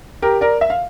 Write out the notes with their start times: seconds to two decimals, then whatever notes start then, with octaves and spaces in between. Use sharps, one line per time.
0.22 G4 A#4
0.41 A#4 D5
0.61 E5
0.70 F5